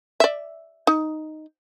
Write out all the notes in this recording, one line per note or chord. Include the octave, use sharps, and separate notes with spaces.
D5 E5
D#4